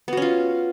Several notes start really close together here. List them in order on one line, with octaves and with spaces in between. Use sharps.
B3 F#4 C#4 F4